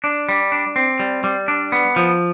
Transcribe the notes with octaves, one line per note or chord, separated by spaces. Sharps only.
D4
G3
D4
C4
G3
G3
D4
B3
F3